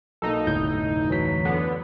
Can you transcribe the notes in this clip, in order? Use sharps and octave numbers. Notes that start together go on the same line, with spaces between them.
B1 A#3 D#4 A4
F1 D2 A2 G6
E3 F#3 B6
D3 B3